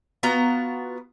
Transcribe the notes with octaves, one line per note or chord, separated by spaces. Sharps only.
B3 F4 F#4 A#5